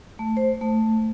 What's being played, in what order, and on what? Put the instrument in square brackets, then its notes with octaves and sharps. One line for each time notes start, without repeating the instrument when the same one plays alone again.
[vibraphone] A3
C5
A3